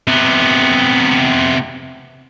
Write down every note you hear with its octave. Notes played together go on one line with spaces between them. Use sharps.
C3 B3